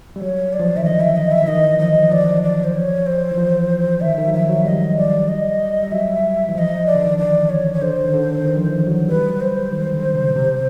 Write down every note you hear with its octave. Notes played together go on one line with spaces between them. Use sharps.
G3
F#3 C#5
D5
F3
E3
D#3 E5
D3 D#5
E5
D#5
E5
E3
D#3 D#5
E3
F3 D#5
F#3
F3 D5
D5
C5
C#5
C5
E3
F3
D#3 E5
D#3
F#3
F3 E5
F#3
G3 D#5
D5
D#5
G3
F#3 E5
E3
F3 D#5 E5
D5
D3
D#3
E3 D5
C#5
C#5
D3 C5
D#3
D3
D#3
F3
E3
F#3
G3 B4
F#3
C5
D#3
D3
C#3
B2
C3